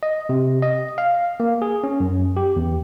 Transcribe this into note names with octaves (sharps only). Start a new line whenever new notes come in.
D#5
C3
D#5
F5
A#3
G#4
C#4
F#2
G4
E2